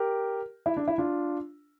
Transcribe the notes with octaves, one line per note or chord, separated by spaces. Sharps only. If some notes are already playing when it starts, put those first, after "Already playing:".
Already playing: G4 A#4
E4
D4
E4
D4 F4